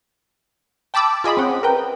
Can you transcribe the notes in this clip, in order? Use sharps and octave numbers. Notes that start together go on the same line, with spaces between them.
G5 A5 B5 D6 E6
F4 G#4 D#5 B5
C4 C#4 F#5 G5
A#4 B4 G5